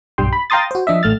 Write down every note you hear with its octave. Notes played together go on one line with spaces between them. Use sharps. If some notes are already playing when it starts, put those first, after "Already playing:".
B1 G2 G3 G5 C6
B5
F5 G5 A#5 C6 D#6 A6
F#4 C5
F3 D4 D#5 E5
A1 A3 F6 A6